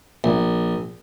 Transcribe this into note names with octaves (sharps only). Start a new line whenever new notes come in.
A#1